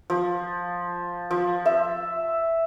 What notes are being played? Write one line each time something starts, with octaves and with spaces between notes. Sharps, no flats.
F3
F3
E5